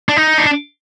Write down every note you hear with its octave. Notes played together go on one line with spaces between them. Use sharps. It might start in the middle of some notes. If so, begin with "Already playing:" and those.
D4
D#4
D4